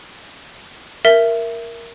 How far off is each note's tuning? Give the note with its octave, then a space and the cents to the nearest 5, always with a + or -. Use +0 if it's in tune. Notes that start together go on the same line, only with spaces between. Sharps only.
A#4 +0 E5 +15